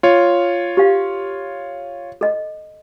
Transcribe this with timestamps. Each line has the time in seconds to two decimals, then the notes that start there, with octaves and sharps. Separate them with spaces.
0.03 F4 C#5
0.77 G4 F5
2.21 A4 D#5